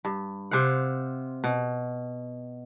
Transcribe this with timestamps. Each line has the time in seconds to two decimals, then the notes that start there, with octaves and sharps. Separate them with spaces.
0.05 G2
0.51 C3 C5 F5 F#5
1.44 B2